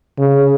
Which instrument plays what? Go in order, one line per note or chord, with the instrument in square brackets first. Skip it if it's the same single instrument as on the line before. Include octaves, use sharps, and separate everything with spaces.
[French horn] C#3